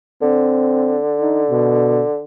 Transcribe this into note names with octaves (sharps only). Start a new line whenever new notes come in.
D3 C4
D#4
B2